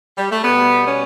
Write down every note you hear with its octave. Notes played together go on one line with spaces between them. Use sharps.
G3
A3
B2 G3 B3
C#4